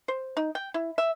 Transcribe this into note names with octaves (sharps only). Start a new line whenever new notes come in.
C5
D#4
G5
E4
E5